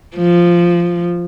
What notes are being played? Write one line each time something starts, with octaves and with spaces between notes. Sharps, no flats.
F3